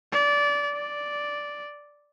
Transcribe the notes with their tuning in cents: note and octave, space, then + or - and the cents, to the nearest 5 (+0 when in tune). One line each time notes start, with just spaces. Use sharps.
D5 -20
D5 -5